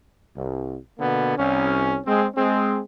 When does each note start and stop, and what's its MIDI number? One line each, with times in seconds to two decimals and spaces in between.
0.35 0.77 36
0.98 1.36 47
0.98 1.36 50
0.98 1.36 58
0.98 1.36 59
1.37 1.97 36
1.37 1.97 61
2.05 2.26 56
2.05 2.26 60
2.35 2.79 56
2.35 2.79 60